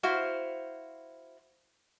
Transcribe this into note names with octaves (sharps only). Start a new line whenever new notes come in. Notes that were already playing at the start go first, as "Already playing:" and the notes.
E4 F#4 C5 F5